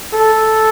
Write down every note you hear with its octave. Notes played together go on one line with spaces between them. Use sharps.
A4